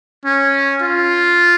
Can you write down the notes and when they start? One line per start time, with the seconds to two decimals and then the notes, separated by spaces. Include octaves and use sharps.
0.25 C#4
0.82 F4